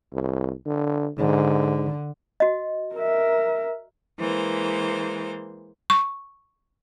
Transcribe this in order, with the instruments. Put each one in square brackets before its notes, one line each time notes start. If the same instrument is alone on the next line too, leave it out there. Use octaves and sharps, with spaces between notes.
[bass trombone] C2
D3
[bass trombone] G#2 [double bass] D3
[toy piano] F#4 D#5
[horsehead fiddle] A#4 E5
[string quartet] E3 G#3 A#3 C5
[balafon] C#6